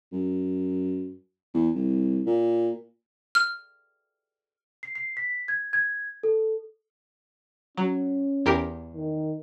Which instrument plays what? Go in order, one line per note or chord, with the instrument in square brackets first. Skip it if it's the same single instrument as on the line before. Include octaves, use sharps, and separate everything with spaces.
[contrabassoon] F#2
E2
C2
A#2
[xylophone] F6
[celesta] C7
C7
B6
G#6
G#6
A4
[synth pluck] F#3 [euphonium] C#4
[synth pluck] E2 G4 A#4
[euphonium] D#3